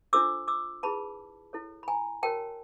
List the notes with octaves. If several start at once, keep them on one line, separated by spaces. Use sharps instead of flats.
D4 F4 A4 C5 D6 E6
D6 E6
E4 G#4 B4 A5 B5
E4 A4 C#5
B5
G#5 A#5
F#4 A#4 C#5 G5 A5